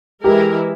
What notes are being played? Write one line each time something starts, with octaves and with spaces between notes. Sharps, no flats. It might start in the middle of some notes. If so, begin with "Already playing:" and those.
E3 G#3 E4 G4 A#4